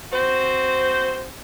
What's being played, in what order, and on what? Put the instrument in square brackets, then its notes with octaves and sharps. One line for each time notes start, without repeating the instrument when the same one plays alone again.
[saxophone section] C4 F#4 C5